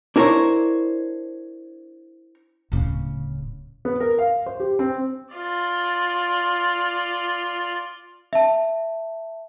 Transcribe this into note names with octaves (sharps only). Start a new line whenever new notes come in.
D4 E4 A#4 C5 C#5
D1 C#3
B3
A#4
F5
C5
G4
C4
F4 D5
E5 A5